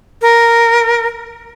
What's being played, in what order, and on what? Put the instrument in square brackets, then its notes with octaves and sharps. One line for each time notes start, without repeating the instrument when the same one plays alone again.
[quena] A#4